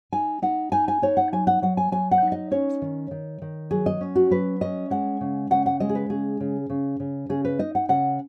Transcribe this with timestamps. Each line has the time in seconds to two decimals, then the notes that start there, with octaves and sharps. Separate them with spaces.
0.13 D#4 G#5
0.42 D#4 F#5
0.72 D#4 G#5
0.88 G#5
1.02 D#4 C#5
1.17 F#5
1.32 F#3 G#5
1.47 F#5
1.62 F#3 F#5
1.77 G#5
1.92 F#3 G#5
2.11 F#5
2.22 D#4
2.32 D#5
2.51 C#4 C#5
2.82 D#3
3.11 D#3
3.42 D#3
3.71 F#3 G#4
3.86 D#5
4.01 C#4
4.15 F#4
4.30 F#3 B4
4.61 C#4 D#5
4.90 G#3 F#5
5.21 C#3
5.50 C#3 F#5
5.66 F#5
5.80 G#3 D#5
5.89 G#4
5.95 B4
6.09 C#3 G#4
6.40 C#3
6.70 C#3
7.00 C#3
7.29 C#3 G#4
7.45 B4
7.59 D#4 D#5
7.75 F#5
7.89 C#3 F#5